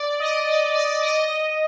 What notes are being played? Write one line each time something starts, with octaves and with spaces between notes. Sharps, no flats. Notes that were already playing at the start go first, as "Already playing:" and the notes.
Already playing: D5
D#5
D5
D5
D5
D#5